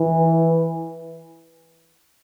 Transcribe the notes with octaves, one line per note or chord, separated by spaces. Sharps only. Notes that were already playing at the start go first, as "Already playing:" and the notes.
Already playing: E3